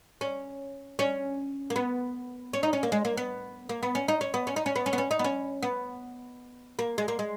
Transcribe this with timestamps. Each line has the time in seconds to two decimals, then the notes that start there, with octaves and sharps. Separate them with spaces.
0.21 C#4
0.99 C#4
1.70 A#3
1.76 B3
2.53 C#4
2.63 D#4
2.73 C#4
2.83 A#3
2.92 G#3
3.05 A#3
3.17 B3
3.69 A#3
3.83 B3
3.95 C#4
4.08 D#4
4.21 C#4
4.34 B3
4.47 C#4
4.56 D#4
4.66 C#4
4.76 B3
4.86 C#4
4.93 B3
4.98 C#4
5.11 D#4
5.19 B3
5.24 C#4
5.63 B3
6.79 A#3
6.98 G#3
7.08 A#3
7.19 G#3